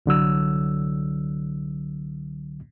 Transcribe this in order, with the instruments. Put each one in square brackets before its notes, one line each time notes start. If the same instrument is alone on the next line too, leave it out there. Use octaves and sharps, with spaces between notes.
[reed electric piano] C2 D3 F#3 E6